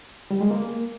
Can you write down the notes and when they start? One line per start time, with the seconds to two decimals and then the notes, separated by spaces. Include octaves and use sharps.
0.31 G3
0.41 G#3
0.51 A#3